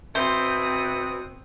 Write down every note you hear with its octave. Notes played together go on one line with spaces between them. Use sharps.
B2 C4 C5 E5 D#6